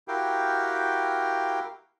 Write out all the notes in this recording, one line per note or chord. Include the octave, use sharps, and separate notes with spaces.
E4 F#4 G4 A#4 F5 G5